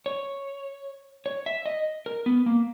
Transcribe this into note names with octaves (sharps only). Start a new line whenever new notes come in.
C#5
C#5
E5
D#5
A#4
B3
A#3